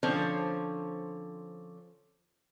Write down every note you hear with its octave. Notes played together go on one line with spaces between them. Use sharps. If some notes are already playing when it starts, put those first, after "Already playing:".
D3 F3 C4 C#4 C5 C#5